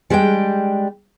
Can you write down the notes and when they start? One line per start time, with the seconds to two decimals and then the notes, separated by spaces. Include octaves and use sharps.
0.10 G3 G#3 D4 D#5 G5